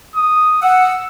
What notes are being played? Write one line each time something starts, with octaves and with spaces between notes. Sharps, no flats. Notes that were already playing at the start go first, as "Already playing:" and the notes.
D#6
F#5 E6